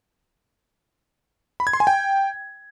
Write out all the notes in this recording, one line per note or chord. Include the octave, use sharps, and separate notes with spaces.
B5
G#6
C6
G#5
G5